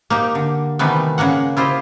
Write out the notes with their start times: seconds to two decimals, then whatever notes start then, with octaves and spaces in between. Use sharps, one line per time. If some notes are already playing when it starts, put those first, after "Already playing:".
0.10 A#3 D#4 G4
0.35 D3
0.79 C3 D#3 E3 G3 A3 B3
1.18 C#3 G#3 A#3 F#5
1.57 E4 F4 G4 C5 D#5